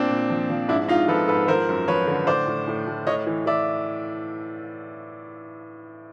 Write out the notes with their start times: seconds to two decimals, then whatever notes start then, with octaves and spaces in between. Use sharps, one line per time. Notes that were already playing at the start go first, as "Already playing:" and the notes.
Already playing: A#2 C4 D4
0.10 A#2
0.30 F3
0.50 F3
0.68 G#2 D4 E4
0.88 G#2 D#4 F4
1.08 F3 A4 B4
1.28 G#2 A4 B4
1.48 F3 A#4 C5
1.69 F#2
1.88 F3 B4 C#5
2.07 D3
2.27 A2 C5 D5
2.47 A2
2.67 A2
2.87 A2
3.07 A2 C#5 D#5
3.27 E3
3.46 E3 D5 E5